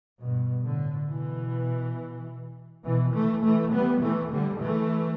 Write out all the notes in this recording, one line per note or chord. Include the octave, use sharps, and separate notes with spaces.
G2 B2
A2 D3
B2 E3
B2 E3
E3 A3
E3 A3
G3 B3
E3 A3
D3 G3
E3 A3